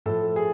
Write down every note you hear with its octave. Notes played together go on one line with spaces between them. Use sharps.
A2 F3 A4
G#4